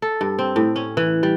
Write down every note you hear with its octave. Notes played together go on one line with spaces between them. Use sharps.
A4
G2
C4
A2
C#4
E3
G3